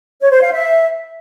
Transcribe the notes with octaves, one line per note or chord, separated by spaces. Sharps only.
C#5
C5
F5
E5